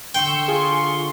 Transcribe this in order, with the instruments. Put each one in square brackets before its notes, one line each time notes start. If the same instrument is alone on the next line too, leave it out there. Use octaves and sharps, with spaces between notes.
[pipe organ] D3 C6 [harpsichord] G5 [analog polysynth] C#6 E6
[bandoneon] F4 [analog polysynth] G#4 C#6